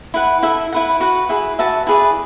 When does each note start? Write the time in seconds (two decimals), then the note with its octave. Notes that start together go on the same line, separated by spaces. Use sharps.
0.14 E4 B4 F#5
0.43 E4 A4 E5
0.72 E4 B4 F#5
1.00 F#4 B4 F#5
1.29 E4 G#4 B4
1.59 F#4 B4 E5 A5
1.87 E4 G#4 B4 D5